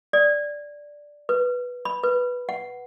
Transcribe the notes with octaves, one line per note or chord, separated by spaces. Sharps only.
D5
B4
B5
B4
F#5